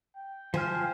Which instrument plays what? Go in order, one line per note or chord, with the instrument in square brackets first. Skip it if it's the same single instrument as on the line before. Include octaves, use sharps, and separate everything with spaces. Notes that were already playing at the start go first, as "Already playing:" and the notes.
[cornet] G5
[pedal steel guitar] F3 G#5 F6 [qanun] C5